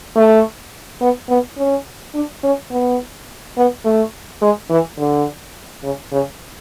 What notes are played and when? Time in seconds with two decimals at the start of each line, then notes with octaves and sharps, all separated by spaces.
0.16 A3
1.01 B3
1.29 B3
1.58 C#4
2.14 D4
2.43 C#4
2.71 B3
3.57 B3
3.85 A3
4.41 G#3
4.70 E3
4.99 D3
5.83 C#3
6.12 C#3